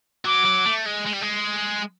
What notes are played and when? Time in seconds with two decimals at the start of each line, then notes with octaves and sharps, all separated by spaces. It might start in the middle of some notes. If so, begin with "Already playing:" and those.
0.25 F#3 D6
0.45 F#3
0.66 A3
0.86 G#3
1.07 G#3
1.14 G3
1.22 G#3